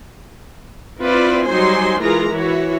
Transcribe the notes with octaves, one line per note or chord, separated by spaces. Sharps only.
C4 E4 F4 B4 D5 E5
F#3 G3 D#4 C5 G#5 C6
E3 G#3 F4 G#4 A#4 A#5
E3 E4 F#4 C#5